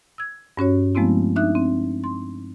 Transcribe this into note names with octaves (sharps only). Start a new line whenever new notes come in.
E6 G#6
G2 C#4 F#4 C#5
F3 G#3 A3 B3 C4 E4
D4 D#4 E5 F#6
C4
C6